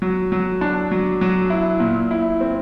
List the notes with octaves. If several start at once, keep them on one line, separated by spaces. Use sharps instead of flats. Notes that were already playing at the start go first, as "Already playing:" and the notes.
F#3
F#3
D4
F#3
F#3
E4
A#2
E4
C4